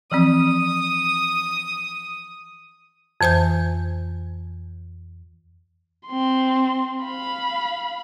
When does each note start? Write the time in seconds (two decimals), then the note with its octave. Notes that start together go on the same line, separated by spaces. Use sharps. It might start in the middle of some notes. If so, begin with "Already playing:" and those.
0.12 E3 F3 C4 D#6
3.21 F2 E3 C5 G#5 G6
6.07 C4 C6
7.04 F5 B5